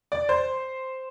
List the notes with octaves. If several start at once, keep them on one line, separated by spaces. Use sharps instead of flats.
D5
C5